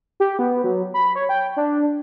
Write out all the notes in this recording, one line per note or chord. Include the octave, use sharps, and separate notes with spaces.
G4
B3
F#3
B5
C#5
G5
D4